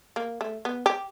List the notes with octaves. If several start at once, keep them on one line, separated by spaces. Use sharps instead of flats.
A#3
A3
B3
G4